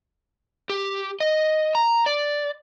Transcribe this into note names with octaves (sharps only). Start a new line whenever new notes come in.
G4
D#5
A#5
D5